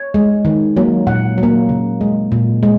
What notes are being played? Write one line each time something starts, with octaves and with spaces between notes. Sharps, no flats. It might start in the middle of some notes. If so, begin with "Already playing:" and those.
Already playing: C#5
G#3
D#3
F#3 A#3
A#2 F#5
F#3
A#3
C#3
G#3
A#2
G#3